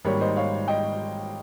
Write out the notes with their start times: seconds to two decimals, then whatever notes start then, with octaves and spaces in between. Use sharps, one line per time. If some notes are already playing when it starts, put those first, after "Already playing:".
0.05 G#1 G#2 G3 A#3 C#5
0.21 C5 D#5
0.36 C#5 F5
0.68 D#5 G5